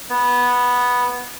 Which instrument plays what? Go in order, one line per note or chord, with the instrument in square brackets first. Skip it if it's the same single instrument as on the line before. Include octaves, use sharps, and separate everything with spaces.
[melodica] B3